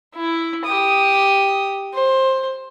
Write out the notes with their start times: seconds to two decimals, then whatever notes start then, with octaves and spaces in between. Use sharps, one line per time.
0.16 E4
0.65 G4 D#6
1.94 C5